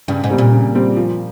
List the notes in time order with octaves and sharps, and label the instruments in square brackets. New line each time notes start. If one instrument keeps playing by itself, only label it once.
[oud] G2 [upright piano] C#3
[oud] G#2
[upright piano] G3 C4
[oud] A#2
[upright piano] C#3
G3 C4
F3